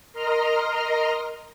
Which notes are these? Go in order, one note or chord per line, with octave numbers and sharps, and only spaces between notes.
A#4 D#5 A#5 C6 F6